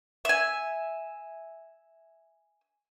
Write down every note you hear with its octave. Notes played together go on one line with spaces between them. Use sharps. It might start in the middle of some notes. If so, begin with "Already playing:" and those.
E5 G#5